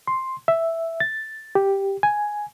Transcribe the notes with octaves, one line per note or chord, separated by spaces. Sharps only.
C6
E5
A6
G4
G#5